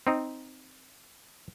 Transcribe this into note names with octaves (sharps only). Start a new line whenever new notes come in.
C4 D#4